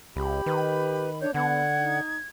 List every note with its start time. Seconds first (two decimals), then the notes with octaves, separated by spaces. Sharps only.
0.16 C#2 G4 B5
0.46 D#3 B4
1.21 D4 C#5 G6
1.34 D3 B3 F#5 G#6
1.79 D#4